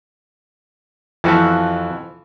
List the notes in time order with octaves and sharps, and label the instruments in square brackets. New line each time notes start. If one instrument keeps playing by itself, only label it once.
[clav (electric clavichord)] F2 F#4 E5 [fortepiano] E3 F3